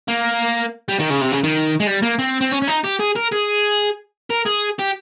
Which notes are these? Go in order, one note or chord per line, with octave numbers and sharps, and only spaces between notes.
A#3
G3
D#3
C#3
C3
C#3
D#3
G#3
G3
A#3
C4
C4
C#4
C#4
D#4
G4
G#4
A#4
G#4
A#4
G#4
G4